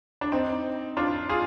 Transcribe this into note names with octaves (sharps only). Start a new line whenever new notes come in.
D4
C4 D#4
D4 F4
F4 G#4